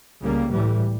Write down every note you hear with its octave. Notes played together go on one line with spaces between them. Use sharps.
C#2 C#3 G3 A#3
A2 E3 G3